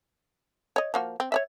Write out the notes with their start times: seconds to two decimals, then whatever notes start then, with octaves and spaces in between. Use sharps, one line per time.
0.76 C#5 D#5
0.94 F3 A#3 F#4
1.20 C4
1.32 C#5 D5 E5